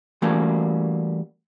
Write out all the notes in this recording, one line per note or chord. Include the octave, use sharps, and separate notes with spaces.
E3 G3 A3 A#3 C#4 F#4